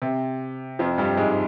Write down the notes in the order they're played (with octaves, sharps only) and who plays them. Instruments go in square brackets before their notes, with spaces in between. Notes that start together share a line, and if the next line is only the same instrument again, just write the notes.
[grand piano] C3
F2 F3
G2 G3
G#2 G#3